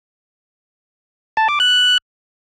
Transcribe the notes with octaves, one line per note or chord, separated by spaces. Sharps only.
A5
D6
F#6